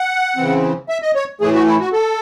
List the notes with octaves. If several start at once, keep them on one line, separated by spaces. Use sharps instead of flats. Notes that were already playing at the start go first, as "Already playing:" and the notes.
Already playing: F#5
C#3 E3 C4
E5
D#5
C#5
A2 E3 A3 G#4
F#4
E4
F#4
A4